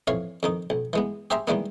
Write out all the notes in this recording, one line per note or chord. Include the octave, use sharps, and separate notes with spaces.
F2 E3 C#5 F5
F2 D#3 D#4
B1
E3 G#3 B3
G4 G#4 C5 E5 A#5 C6
D#3 E3 G3 G#3 A#3 B3